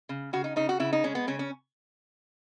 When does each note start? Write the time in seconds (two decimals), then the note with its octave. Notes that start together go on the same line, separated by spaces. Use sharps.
0.09 C#3
0.33 C#3 F#4
0.44 D#4
0.56 C#3 D#4
0.69 F#4
0.79 C#3 E4
0.93 D#4
1.04 G#3 C#4
1.15 B3
1.27 C#3 C#4
1.39 C#4